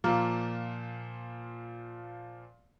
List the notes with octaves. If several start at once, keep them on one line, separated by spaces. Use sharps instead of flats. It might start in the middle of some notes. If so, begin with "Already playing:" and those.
A#2 F3 A#3